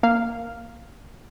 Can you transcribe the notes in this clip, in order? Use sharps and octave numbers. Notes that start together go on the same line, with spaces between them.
A#3 F5